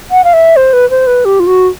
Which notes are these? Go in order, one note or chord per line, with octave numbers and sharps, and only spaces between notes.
F#5
F5
E5
C5
B4
C5
B4
G4
F4
F#4